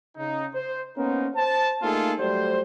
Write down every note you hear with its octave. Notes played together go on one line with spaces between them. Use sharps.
C#3 D#4
C5
A#3 B3 C#4 D#4 A#4 C5
C5 A5
A3 A#3 D#4 F4 G#4 A4
F#3 G3 A3 C5